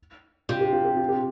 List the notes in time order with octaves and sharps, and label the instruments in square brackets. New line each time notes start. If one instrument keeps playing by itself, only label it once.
[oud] C3 [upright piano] F4
[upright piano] G4
F4
G4
F4
G4